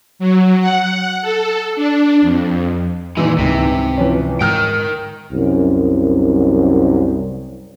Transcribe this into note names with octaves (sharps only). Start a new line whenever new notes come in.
F#3
F#5
A4
D4
F2
A#2 D#3 E3 G#3 E4
C#2 G#2 C3 G3
E3 F3 C#4
G#2 A#4 G5 D#6 F6 G6
C2 F#2